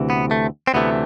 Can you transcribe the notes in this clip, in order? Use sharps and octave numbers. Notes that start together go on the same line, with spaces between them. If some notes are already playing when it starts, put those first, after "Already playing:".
Already playing: D2 C3 E3
B3
A3
C4
D2 C3 E3 A3 B3